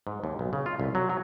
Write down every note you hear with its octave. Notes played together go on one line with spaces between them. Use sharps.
G#2
D#2
B1
C#3
F4
C2
F#3
F#3